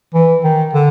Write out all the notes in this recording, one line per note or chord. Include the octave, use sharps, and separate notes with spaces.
E3
D#3
D3